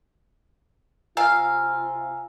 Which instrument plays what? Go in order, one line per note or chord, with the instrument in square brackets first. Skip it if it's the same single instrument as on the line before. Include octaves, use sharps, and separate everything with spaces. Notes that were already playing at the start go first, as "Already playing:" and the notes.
[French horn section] C3 F4 [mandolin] F5 [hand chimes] G#5 A#5 E6